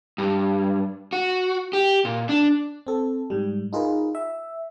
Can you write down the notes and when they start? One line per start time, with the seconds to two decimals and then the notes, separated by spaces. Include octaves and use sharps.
0.18 G2
1.13 F#4
1.73 G4
2.05 A#2
2.29 D4
2.87 C4 A4
3.30 G#2 G3
3.73 D#4 F4 G#4 A#4 B4
4.15 E5